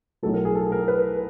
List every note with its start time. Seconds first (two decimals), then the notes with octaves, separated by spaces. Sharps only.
0.22 B1 A2 F#3 A4
0.34 A#4
0.45 G#4
0.55 A4
0.72 A#4
0.88 B4